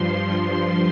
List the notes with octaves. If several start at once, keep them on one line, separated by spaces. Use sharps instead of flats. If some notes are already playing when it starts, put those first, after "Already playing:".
Already playing: G2 F3 C6